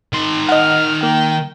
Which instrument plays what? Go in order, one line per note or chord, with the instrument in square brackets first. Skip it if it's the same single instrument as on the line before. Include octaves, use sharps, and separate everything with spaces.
[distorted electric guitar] D#3 C6
[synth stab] D#5 F#5 [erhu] F6
[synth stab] A#3 [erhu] G5